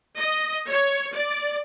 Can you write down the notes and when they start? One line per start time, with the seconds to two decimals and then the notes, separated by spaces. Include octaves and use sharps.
0.17 D#5
0.70 C#5
1.14 D5